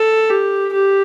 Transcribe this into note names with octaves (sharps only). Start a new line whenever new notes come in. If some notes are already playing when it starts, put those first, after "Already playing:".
Already playing: A4
G4
G4